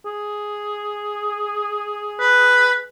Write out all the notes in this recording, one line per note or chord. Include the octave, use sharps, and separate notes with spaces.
G#4
B4